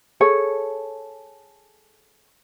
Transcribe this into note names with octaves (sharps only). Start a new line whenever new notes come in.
G#4 A4 C#5